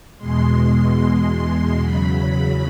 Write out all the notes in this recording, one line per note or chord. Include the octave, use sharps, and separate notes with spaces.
E2 B2 G#3 C6
E2 C#3 F#3 B5